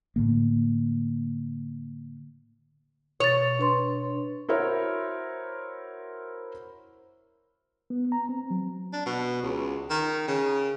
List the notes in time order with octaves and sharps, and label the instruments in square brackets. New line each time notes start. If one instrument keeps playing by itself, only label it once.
[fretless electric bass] A2 D3 A#3
[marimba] B2 A6 [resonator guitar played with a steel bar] C#5
[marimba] D4 B4 C6
[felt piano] E4 F#4 A#4 C5 C#5 E5
[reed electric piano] B3
A#5
C4
F#3
[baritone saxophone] D4
B2
C#2
D#3
C#3